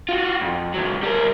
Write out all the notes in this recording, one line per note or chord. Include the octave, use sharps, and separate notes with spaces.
F4 F#4
F2
C#2 F#3
G3 A#4